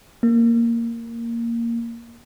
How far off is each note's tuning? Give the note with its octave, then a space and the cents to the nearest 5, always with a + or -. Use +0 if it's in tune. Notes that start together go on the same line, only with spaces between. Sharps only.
A#3 -5